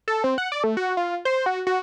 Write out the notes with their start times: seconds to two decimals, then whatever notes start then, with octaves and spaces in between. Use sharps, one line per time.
0.08 A4
0.24 C4
0.38 F#5
0.52 D5
0.64 A3
0.77 F#4
0.97 F4
1.25 C5
1.46 F#4
1.67 F#4